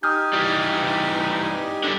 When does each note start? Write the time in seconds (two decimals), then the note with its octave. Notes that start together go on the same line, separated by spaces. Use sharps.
0.03 D#4 G4 G#5 D#6 F6 G6
0.33 E3 G3
1.84 D3 G3